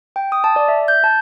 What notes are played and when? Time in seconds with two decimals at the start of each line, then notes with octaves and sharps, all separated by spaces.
0.16 G5
0.32 D#6
0.44 A5
0.56 D5
0.68 E5
0.88 G6
1.04 A5